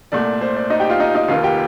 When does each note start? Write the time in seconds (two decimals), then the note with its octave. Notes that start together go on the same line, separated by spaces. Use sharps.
0.12 C2 A#2 A3 D5
0.41 C5
0.56 D5
0.70 D#4 D#5
0.80 G4 G5
0.89 F4 F5
1.00 D#4 D#5
1.15 D#4 D#5
1.28 F1 D#2 D#3 F4 F5
1.43 G4 G5